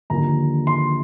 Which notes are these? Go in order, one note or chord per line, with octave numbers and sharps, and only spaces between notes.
D#2 D3 F3 A#5
C6